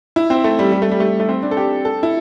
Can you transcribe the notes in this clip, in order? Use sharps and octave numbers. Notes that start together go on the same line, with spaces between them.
E4
C4
A3
G3
G3
A3
G3
A3
A3
C4
D4
A4
G4
A4
E4